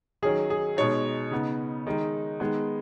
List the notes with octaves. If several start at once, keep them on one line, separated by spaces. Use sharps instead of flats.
D#3 F#3 C#4 G#4
G#4
B2 G#3 D#4 C#5
C#3 B3 D#4
D#3 G#3 D#4
D#3 G#3 B3